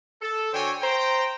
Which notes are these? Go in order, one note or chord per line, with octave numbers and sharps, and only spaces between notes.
A4
D3 F#4 C5 C#5 G5 G#5
C5 G5 A#5